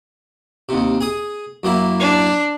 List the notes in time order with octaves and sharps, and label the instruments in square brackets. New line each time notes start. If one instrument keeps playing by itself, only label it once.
[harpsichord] D#2 C3
G#4 D#6
F#2 A#3 E4
[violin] D4